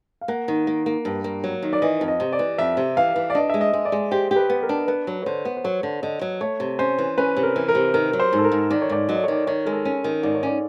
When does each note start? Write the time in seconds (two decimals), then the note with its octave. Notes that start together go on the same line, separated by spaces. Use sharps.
0.21 F5
0.28 A#3 F#5
0.48 D#3
0.67 A#3
0.86 A#3
1.05 G2
1.24 A#3
1.44 F#3
1.63 D#3
1.73 D5
1.82 E3 D#5
2.01 F2
2.08 D#5
2.20 C3
2.33 D5
2.39 E3
2.58 F2 E5
2.77 C3
2.97 E3 F5
3.16 E3
3.30 D5
3.35 D4 D#5
3.50 G#3 E5
3.61 D#5
3.73 G#3
3.85 D5
3.92 G#3
4.11 G4 C5
4.31 G4
4.36 B4
4.50 B3
4.63 A#4
4.69 D4
4.88 B3 B4
5.07 F#3
5.22 C#5
5.26 D3 C5
5.45 B3
5.57 C5
5.64 F#3 C#5
5.83 D3
6.02 D3 D#5
6.21 F#3
6.41 A3 C#5
6.60 C3
6.79 C#4 C5
6.98 E3
7.18 C#4 B4
7.37 C3
7.43 A#4
7.56 E3
7.68 A#4
7.75 C3
7.94 D#3 A#4
8.13 F#3
8.20 C5
8.33 G#2
8.38 A4
8.44 A#4
8.52 G#2
8.70 D#3 D5
8.82 C#5
8.90 G#2 D5
9.09 F#3 D#5
9.16 D5
9.24 C#5
9.28 D#3 D5
9.47 D#3 C#5
9.66 G#3 A#4
9.73 A4
9.85 C#4
10.04 D#3
10.23 G#2 D5
10.35 C#5
10.43 C#4 D5